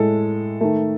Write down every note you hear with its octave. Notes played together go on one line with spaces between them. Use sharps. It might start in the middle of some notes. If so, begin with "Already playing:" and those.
Already playing: A2 G#3 A4
D#3 A3